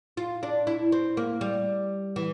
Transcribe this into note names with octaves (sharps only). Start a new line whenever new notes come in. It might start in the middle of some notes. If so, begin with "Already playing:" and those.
F4
D4
E4
C4
A#3
G3
E3